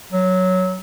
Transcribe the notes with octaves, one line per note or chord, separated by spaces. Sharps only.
F#3